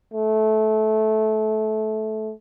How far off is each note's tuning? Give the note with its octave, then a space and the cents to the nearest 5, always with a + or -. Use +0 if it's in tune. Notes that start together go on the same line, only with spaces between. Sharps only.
A3 -20